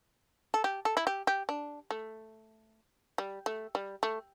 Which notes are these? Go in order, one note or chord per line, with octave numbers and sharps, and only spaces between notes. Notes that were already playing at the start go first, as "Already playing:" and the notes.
A4
G4
A4
E4
G4
G4
D4
A3
G3
A3
G3
A3